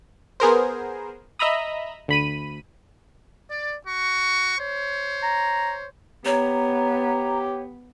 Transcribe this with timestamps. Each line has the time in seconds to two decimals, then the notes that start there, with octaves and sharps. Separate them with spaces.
0.40 B3 G#4 A#4 C5
1.39 D#5 E5 A#5 B5 D#6
2.08 D2 B5 D#7
3.50 D5
3.86 F#4 C#6
4.58 C5 C#5
5.23 A#5
6.25 B3 G4 C#5 A#5